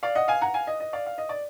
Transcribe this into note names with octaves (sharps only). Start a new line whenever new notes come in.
D5 F5
D#5 F#5
F5 G#5
F#5 A#5
F5 G#5
D#5
D#5
D5 F5
F5
D#5
D5